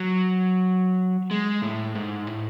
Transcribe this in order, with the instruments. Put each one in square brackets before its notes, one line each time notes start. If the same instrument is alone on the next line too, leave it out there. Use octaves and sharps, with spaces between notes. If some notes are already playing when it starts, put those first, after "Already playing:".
Already playing: [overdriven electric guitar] F#3
G#3
A2
G#2
A2